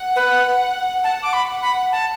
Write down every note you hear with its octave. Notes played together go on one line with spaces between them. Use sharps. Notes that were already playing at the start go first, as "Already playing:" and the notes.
Already playing: F#5
B4
F#5 A5
D6
B5
F#5
B5
A5